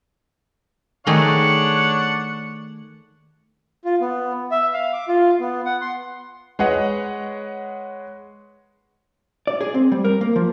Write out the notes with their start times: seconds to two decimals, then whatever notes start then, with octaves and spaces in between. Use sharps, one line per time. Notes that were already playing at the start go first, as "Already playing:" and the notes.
1.07 D#3 A3 D4 G#4 C#5 F#5
3.85 F4
4.01 B3
4.51 E5
4.73 F5
4.93 D6
5.08 F4
5.40 B3
5.66 F#5
5.81 C6
6.59 G#3 B4 C#5 D#5 F#5
9.47 D5
9.61 G#4
9.74 C4
9.92 G3
10.05 A#4
10.21 A#3
10.36 F3